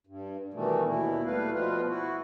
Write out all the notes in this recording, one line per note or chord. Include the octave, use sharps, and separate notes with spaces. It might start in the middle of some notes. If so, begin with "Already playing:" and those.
G2
B2 D#3 E3 G3 A3
D#2 B2 E4
G3 A3 B4 F5
B2 F3 F4 B4
E4 F#4